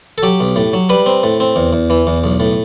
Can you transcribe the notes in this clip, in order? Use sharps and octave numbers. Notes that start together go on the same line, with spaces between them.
A4
F#3 G4
B1
A2
F#3
G3 B4
C4
A2
C4
E2
E2
E3
E2
B1
A2